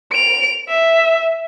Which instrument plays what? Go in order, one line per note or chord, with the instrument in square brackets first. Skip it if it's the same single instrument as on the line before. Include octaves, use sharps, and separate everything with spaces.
[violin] D7 F7
E5